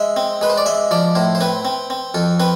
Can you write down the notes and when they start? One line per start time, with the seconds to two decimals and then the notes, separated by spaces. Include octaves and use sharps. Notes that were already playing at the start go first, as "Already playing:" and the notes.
Already playing: G#3 E5
0.16 C4
0.41 G#3 B4
0.50 C5
0.58 D5
0.66 G#3 E5
0.91 F3 D5
1.15 A2 C5
1.35 C5
1.40 C4 B4
1.65 C4
1.90 C4
2.14 F2 A4
2.40 C4 B4